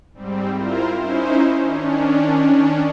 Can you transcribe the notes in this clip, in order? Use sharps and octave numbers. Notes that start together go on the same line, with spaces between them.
G#2 G3 C4
E4 F4 A#4 C5
C#4 D#4 E4 C5
D#3 C#4 D4